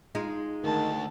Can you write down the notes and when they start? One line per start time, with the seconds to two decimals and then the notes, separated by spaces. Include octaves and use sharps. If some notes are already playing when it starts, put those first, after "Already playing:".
0.15 G#3 D#4 F4
0.64 D2 D#3 A5